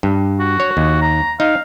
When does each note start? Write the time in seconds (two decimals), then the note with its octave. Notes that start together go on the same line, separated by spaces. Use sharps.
0.03 G2
0.40 F#4
0.60 C#5
0.77 D#2
1.01 A#5
1.40 D#4 F5